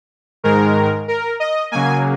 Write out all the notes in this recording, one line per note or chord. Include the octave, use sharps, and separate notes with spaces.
G#2 D#3 G#3 A#4
A#4
D#5
C#3 F#3 A#3 G#5